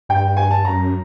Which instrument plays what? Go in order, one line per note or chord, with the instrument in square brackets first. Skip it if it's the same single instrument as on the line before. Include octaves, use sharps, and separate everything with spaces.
[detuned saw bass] G2 [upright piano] G5
[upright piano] G#5
A5
[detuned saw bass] F#2 [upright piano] A#5